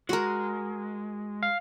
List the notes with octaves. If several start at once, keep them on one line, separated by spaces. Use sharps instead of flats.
G#3 F#4 A#4
F5